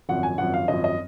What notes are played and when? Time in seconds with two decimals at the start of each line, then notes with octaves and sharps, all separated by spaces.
0.09 G#1 F#2 F3 F#5
0.23 G#5
0.38 G#1 F#2 F3 F#5
0.54 F5
0.68 G#1 F#2 F3 D#5
0.84 D#5